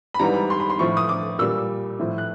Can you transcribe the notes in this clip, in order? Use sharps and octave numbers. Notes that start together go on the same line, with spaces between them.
B5
G#2 E3 G3 A#5
B5
C6
B5
C6
A2 F3 C#6
D#6
D6
A#2 G3 E6
A2 F3
F#6